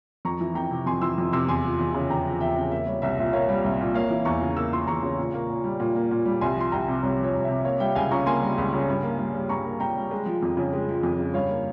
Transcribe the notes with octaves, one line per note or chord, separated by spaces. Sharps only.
F2 A#5 C#6
E3
F2 G5 A#5
C3
F2 G#5 C6
E3 C6 E6
F2
C3 C6 E6
E2 G#5 C6
F3
E2
C#3
E2 G5 A#5
F3
E2 E5 G5
C#3
A#3 E5
G3 C#5
C2 E5
A#2 E5
A#3 C#5 F5
G3
C2
A#2
A#3 C#5 F5
E3
E2 A#5 C#6
C#3
A#3 E6
E3 C6 E6
E2 A#5 C#6
C#3
A#2
A#3
A#2
G3
A#2
A#3
A#2
G3
C2 G#5 C6
F3 C6
C2 G5 A#5
C3
C2 C#5
F3
C#5
C2
C3 E5
A#3 C#5 F5
G3 E5 G5
C#2 F5 G#5
C#3 A#5 C#6
A#3 G#5 C6
G3
C#2
C#3
G2
A#3
G2
G3
G2 A#5 C#6
A#3
G2 G5 A#5
G3
G#3
F3
F2
C#3
G#3
F3
F2
C#3
G2 C#5 F5
A#3